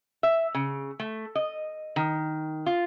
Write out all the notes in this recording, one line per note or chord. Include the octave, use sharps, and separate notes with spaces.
E5
C#3
A3
D#5
D#3
F4